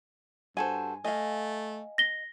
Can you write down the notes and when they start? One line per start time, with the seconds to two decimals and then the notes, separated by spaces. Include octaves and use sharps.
0.57 G2 F#4 A4 C5 G#5
1.04 A3 D#5 F5 G#5
1.98 A#6 G7